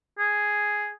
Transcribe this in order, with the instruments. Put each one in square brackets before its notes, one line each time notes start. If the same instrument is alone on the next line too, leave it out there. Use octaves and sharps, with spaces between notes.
[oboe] G#4